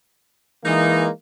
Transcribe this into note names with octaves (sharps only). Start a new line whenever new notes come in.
E3 G#3 A#3 D#4